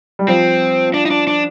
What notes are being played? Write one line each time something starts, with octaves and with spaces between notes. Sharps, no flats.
G3
F3 C4
D4
D#4
D4
D4